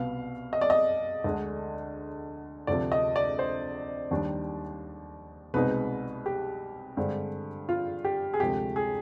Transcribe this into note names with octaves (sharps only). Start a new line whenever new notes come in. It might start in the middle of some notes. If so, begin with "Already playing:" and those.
Already playing: C2 B2 B3 F5
D#5
D5
D#5
D2 D3 G#3 D4
D2 C3 F3 D5
D#5
D5
C5
D#2 D#3 G3 D4
C2 B2 G#3 C4 D#4 B4
G4
G2 D3 G#3 C4
F4
G4
G#4
D2 C3 F3 G#3 G4
G#4